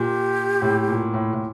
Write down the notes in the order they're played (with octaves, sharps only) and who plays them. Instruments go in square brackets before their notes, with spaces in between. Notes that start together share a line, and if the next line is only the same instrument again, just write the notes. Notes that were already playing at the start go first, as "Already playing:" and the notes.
Already playing: [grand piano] A#2 [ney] G4
[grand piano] A2
A#2
A2
A2